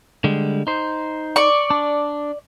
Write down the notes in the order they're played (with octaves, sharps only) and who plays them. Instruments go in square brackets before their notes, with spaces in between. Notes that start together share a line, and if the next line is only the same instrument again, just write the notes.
[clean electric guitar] D3 G3 G#3
D#4 C5
[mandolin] D5 C#6
[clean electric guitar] D4